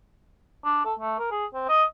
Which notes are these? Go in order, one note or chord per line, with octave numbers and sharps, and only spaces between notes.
D4
A4
A3
A#4
G#4
C4
D#5